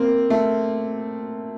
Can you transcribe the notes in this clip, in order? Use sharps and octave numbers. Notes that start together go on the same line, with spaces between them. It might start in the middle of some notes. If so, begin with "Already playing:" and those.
Already playing: A#3 C4
A3